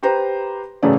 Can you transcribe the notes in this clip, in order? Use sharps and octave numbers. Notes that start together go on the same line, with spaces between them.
G4 B4 C5 A#5
A1 F#2 C#3 A3 G#4 D5